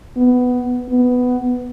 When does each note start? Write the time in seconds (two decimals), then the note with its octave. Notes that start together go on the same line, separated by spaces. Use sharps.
0.17 B3
0.90 B3